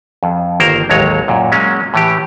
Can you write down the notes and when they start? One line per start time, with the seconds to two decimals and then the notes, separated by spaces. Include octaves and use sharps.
0.23 F2
0.60 G1 D#3 A#3 A#4 C5
0.89 A1 D#2 F#3 G#3 C#5 A#5
1.28 F#2 A#2
1.52 F#3 G#3 A#3 C#4
1.94 A2 E3 G4